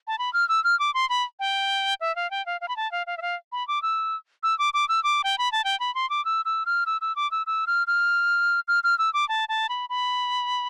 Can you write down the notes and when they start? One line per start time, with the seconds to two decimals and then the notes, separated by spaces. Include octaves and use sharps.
0.07 A5
0.19 B5
0.33 F6
0.49 E6
0.64 F6
0.80 D6
0.94 C6
1.09 B5
1.39 G5
2.01 E5
2.16 F5
2.31 G5
2.46 F5
2.61 F5
2.68 B5
2.77 A5
2.92 F5
3.07 F5
3.17 E5
3.22 F5
3.52 B5
3.68 D6
3.82 E6
4.43 E6
4.59 D6
4.74 D6
4.89 E6
5.04 D6
5.24 G5
5.38 B5
5.52 A5
5.64 G5
5.80 B5
5.95 C6
6.10 D6
6.25 E6
6.45 E6
6.66 F6
6.86 E6
7.01 E6
7.16 D6
7.31 E6
7.47 E6
7.67 F6
7.87 F6
8.68 F6
8.84 F6
8.99 E6
9.14 D6
9.29 A5
9.49 A5
9.69 B5
9.90 B5